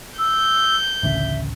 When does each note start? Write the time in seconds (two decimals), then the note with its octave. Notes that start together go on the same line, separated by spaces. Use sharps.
0.19 E6 G6
1.03 A1 D2 C#3 E5